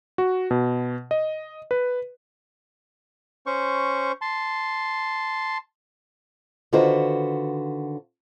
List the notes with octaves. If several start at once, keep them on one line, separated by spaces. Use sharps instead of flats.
F#4
B2
D#5
B4
C#4 C5 C#6
A5 C6
D3 D#3 F4 F#4 B4 C5